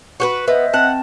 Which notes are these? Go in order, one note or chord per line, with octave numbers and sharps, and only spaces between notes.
F#4 G4 B4
B3 C5 D#5 E5
C4 F#5 A5